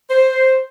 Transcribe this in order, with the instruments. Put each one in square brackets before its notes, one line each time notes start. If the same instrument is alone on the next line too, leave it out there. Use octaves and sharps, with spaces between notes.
[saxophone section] C5